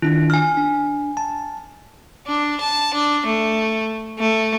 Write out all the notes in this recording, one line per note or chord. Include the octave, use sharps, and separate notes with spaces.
D#3 D4 E4 F4
G#5 F6
D4
A5
D4
A5
D4
A3
A3